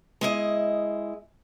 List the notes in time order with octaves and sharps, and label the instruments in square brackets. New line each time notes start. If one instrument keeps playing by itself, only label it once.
[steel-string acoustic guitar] G#3 E4 D#5